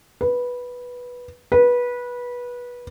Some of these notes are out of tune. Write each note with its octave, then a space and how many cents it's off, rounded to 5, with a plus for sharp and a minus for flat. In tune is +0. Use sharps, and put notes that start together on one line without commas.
B4 -10
B4 -20